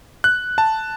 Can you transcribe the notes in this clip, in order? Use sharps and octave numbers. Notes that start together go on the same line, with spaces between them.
F#6
A5